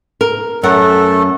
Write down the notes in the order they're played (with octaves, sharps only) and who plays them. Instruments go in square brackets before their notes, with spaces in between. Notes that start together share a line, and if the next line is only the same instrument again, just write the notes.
[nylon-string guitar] A#4
[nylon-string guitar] F#2 A#4 F#5 [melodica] A3 A4